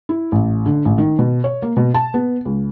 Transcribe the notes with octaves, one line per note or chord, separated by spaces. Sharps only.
E4
A1
D3
A1
D#3
B2
C#5
A#3
B2
A5
B3
C#2